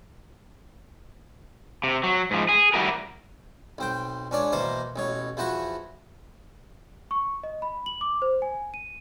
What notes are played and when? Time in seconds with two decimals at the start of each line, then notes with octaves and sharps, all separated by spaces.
1.84 C3
2.03 F#3
2.31 G#2 F3
2.49 G#4
2.74 G3 E4 F#4 A#4
3.78 B1 C4 G5
4.31 C#2 C#4 D4 D5
4.52 B2 E3 A#3 C5 F5
4.96 A1 B2 C#5
5.37 E2 F3 E4 F#4 C#6
7.11 C#6
7.44 D#5
7.62 B5
7.86 F#7
8.01 D6
8.22 C5
8.42 G#5
8.74 D#7